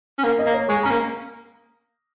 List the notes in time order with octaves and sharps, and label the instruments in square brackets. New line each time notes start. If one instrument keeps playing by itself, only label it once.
[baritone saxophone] C#4
[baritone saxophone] A#3 [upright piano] A#4
[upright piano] D#5
[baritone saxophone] A#3
[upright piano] C#5
[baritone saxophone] G#3 [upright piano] C#6
[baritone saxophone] C#4 [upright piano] A#5
[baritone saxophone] A#3